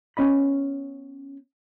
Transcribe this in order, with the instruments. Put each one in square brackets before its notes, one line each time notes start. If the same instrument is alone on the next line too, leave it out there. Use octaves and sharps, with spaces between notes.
[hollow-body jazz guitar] B3 C#4 D#5 B5